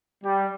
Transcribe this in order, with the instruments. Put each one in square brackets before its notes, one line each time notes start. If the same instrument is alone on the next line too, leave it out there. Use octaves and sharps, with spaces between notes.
[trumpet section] G3